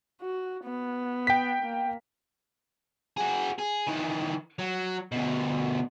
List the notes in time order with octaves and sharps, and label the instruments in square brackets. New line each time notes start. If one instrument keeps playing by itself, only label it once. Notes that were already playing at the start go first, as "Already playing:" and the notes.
[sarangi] F#4
B3
[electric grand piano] G5 B6
[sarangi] A#3
[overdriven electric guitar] F#4 G#4
G#4
D#3 E3
F#3
D2 B2